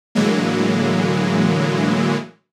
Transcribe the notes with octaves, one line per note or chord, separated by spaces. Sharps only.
A2 D3 E3 F#3 G#3 A#3